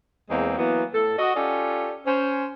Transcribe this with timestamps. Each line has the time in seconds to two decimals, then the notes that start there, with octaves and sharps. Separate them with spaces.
0.30 E2 G#3 A#3 C4
0.58 E3 F#3 A#3 B3
0.94 A2 A4
1.19 F#4 D#5
1.36 C#4 F4 G4 A4 D5
2.06 C#4 C5